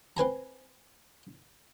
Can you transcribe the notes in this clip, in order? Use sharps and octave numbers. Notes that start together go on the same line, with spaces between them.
C4 B4 G#5 A#5